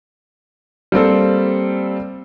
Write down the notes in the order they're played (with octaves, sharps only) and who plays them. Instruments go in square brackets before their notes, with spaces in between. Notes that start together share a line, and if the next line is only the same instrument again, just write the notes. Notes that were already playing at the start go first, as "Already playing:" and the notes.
[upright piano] G3 A#3 C4 A4